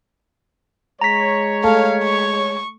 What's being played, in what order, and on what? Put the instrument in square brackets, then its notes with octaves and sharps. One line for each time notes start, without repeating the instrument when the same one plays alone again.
[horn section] G#3 C#5 [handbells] A#5 B6
[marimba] A3 A4 A5 [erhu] F5
[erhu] C#6